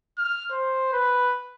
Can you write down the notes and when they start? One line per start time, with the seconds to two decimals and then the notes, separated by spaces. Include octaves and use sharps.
0.18 F6
0.51 C5
0.93 B4